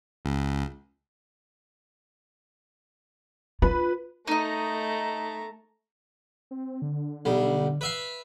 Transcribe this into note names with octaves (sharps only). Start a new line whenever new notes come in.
C#2
F4 B4
A3 D#4 D#5 A#5
C4
D3
B1 G3
B4 E5 F5